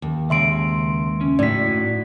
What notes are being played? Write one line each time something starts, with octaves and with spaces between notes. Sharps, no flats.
D#2
C#3 G#3 C#5 E5 C6 D7
C#4
A2 D#4 F#4 D5 B6